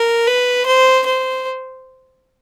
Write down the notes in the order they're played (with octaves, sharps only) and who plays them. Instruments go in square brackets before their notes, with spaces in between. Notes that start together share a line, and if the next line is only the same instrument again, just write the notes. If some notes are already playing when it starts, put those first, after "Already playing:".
Already playing: [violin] A#4
B4
C5
C5